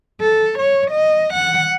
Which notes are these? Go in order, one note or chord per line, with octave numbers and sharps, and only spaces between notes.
A4
C#5
D#5
F#5